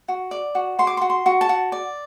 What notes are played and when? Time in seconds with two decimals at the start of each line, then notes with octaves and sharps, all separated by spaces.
0.08 F#4
0.31 D5
0.55 F#4
0.79 F#4 C6
0.87 D6
0.97 C6
1.01 F#4
1.10 C6
1.26 F#4
1.41 A5
1.49 F#4
1.72 D5